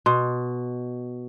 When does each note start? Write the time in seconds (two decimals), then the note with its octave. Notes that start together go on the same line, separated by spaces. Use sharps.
0.06 B2 C6